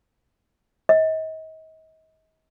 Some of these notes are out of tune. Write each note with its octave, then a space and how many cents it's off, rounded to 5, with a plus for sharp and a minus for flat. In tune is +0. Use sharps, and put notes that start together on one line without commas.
D#5 +40